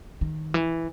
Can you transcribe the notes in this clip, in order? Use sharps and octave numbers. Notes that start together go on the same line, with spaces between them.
D#3
E3